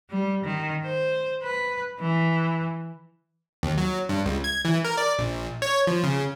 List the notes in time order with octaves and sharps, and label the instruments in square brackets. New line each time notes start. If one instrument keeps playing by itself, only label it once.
[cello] G3
D#3
C5
B4
E3
[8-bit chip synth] D#2
F#3
G2
C#2
G#6
E3
A#4
D5
A#1
C#5
F3
C#3